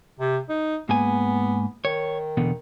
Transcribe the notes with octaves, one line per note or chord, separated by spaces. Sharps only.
C3
D#4
G#2 A#3 B3 G#5
D#3 C#5
E2 B2 D3